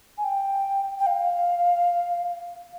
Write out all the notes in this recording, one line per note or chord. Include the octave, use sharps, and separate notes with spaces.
G#5
G5
G5
F5